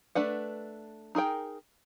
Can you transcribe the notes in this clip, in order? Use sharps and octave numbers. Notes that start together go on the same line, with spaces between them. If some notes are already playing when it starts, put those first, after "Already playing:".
A3 D4 B4 F#5
D#4 G#4 A#4 G5